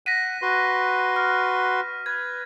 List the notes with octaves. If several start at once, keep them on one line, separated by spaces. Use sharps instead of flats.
F#5 F#6 A#6 B6 D#7
F#4 B4 C6
F6
B4 G#6